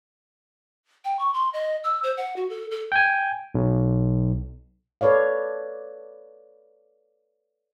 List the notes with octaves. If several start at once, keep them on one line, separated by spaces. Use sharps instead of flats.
G5
C#6
C6
D#5
E6
C5
F#5
F#4
A4
A4
G5 G#5
B1
A4 B4 C#5 D5 F5